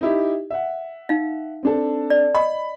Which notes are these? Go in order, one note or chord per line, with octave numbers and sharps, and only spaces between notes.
D#4 E4 G4
E5 F#5
D#4 F5
C4 D4 A4
D5
D#5 B5